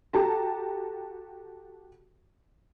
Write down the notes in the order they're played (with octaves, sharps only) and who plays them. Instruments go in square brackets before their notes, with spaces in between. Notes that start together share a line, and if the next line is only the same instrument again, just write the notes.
[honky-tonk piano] F#4 G4 A4 A5 A#5